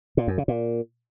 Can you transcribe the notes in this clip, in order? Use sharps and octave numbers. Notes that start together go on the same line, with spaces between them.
A#2
F#2
C#3
A#2